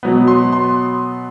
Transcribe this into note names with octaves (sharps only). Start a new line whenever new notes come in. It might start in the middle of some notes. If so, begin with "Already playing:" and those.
B2 F#3 B3
C6
C6